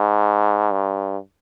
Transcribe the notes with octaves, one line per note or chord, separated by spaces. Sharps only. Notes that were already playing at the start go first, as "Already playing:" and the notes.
Already playing: G#2
G2